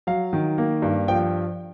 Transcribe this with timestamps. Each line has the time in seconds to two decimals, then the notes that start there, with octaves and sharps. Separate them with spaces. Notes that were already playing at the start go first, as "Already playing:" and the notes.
0.07 F#3 F5
0.33 D#3
0.58 A#3
0.82 G2
1.08 F3 G5